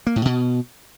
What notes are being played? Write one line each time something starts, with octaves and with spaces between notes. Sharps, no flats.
A#3
A2
B2